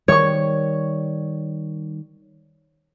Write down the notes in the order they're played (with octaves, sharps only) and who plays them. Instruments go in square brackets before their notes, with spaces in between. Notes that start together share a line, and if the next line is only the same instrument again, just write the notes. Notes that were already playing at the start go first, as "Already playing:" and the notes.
[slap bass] D#3 G3 [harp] C#5 C#6